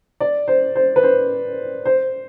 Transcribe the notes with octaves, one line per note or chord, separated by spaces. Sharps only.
D5
C5
C5
B4
C5
C5